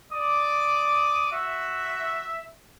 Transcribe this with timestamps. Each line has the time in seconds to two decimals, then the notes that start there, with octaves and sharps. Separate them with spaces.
0.12 D5 D6 D#6
1.32 F#4 E5